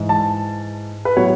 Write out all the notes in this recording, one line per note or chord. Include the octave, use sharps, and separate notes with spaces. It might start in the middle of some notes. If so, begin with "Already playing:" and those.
Already playing: G#2 E3 G#3
A5
B4
A2 F#3 B3 C#5